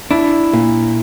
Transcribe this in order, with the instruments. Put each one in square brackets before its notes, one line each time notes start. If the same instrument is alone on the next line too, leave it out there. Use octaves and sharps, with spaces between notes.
[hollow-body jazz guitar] D4 [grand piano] E4
[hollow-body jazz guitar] A#2